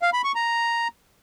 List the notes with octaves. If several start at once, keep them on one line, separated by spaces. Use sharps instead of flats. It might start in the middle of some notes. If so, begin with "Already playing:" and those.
F5
B5
C#6
A#5